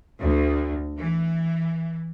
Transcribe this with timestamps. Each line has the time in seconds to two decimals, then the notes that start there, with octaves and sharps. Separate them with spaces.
0.20 D2
0.97 E3